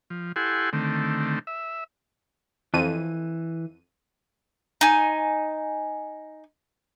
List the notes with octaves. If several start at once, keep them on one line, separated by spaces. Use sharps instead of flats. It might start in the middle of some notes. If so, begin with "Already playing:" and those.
F3
E4 G4 A4 F#5 G#5 C6
D3 D#3 A3 C4
E5
F2 E3 D#7
D#4 G#5